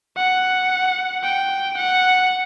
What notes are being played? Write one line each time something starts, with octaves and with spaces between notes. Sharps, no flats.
F#5
G5
F#5